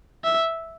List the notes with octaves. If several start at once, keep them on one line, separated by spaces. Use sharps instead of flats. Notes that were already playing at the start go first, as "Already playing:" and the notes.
E5